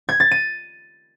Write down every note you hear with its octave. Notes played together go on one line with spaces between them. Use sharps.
G#6
A6
D#7